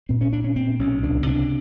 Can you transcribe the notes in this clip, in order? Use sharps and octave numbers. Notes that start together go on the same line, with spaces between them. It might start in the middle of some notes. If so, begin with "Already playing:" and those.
A#2 C4
C#4
A#2 D4
C#4
A#2 C4
B1 C#4
C#2 D4
C3 D4